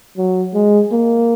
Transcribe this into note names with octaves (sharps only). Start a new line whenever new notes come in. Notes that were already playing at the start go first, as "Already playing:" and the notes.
F#3
G#3
A#3